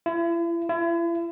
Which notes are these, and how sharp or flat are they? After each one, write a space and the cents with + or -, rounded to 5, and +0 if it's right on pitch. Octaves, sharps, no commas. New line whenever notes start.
E4 +40
E4 +40